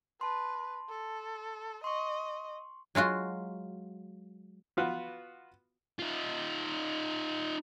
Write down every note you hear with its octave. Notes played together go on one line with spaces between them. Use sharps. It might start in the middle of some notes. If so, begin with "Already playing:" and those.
B4 A5 C6
A4
D#5 C6 C#6
F#3 G#3 F4 F#4
B3 F4 F#4 B4
D#4 F4